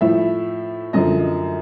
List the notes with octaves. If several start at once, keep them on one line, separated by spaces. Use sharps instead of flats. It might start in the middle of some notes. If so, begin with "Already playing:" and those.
A2 F3 E5
F#2 D3 F3 D#5